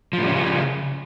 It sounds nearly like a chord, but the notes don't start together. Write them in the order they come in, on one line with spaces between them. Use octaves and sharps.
F3 A2 G3 C#4 C#3